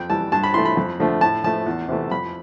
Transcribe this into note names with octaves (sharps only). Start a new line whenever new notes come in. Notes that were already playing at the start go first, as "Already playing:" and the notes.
Already playing: F2 G5
E3 G3 A5
G2 A5
B5
E3 A3 C6
B5
F2
D3 F3 A3
A2 A5
F3 A3 A5
E2
C3 E3 A3
F2 B5